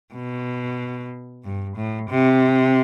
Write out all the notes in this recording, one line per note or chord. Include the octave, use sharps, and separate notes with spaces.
B2
G2
A2
C3